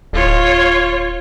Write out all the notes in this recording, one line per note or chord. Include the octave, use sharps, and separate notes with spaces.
D1 F4 C#5